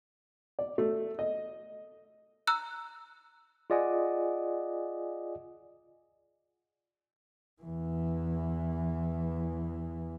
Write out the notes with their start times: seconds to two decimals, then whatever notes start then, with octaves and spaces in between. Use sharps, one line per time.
0.59 D5
0.78 A3
1.19 D#5
2.47 A#5 E6 F#6
3.70 F4 G#4 D5 D#5 F#5 G#5
7.62 E2 E3